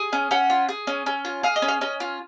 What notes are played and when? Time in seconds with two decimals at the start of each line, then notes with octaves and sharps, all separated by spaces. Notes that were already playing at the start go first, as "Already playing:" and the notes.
Already playing: G#4
0.13 C#4
0.31 C#4 F#5
0.50 F4
0.69 G#4
0.87 C#4
1.06 C#4
1.25 F4
1.43 G#4 F5
1.56 D#5
1.62 C#4
1.68 F5
1.81 C#4 D#5
2.00 F4